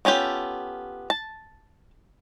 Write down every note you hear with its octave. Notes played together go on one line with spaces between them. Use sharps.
B3 C#4 F4 G4 A4
A5